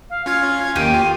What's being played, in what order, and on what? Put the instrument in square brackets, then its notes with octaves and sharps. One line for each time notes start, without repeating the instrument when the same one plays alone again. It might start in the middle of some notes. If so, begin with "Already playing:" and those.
[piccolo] F5
[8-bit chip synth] C#4 F4 G#6 [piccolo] F5
[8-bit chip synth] D#2 D#3 A#3 [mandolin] G4 [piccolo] D#7
[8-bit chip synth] F4